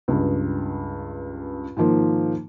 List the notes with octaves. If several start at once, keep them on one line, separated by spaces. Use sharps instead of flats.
C#2 G2
G#2 D#3 F3 A#3